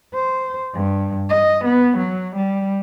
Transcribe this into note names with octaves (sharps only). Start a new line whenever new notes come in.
C5
G2
D#5
B3
F#3
G3